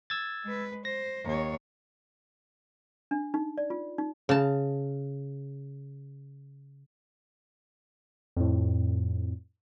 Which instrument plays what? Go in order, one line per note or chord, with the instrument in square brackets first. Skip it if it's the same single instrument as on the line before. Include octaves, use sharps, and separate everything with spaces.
[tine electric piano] E6 G#6 A6
[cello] G#3 B4
[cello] C5 [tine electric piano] A#6
[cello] D#2 C#5
[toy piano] D4
D#4
D5
F4
D#4
[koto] C#3 A5
[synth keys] F2 A2